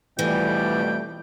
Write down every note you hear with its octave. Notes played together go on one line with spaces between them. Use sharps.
F2 B2 E3 G3 A3 G5